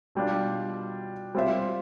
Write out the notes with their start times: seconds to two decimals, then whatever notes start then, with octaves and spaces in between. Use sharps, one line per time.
0.15 B2 G3 D4 F4
1.35 G3 C4 F4 C5 E5